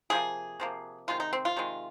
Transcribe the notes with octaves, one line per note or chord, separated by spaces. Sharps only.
C3 F3 A#3 G#4
C3 F3 A#3
C3 D#3 G#3 F4
D#4
C4
F4
C3 D#3 G#3